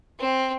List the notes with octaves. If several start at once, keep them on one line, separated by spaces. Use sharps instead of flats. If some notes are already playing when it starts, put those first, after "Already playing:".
C4